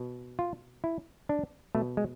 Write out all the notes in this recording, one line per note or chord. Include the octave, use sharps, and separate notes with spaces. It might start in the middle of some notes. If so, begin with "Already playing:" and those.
Already playing: B2
F4
E4
D4
B2 A3
G#3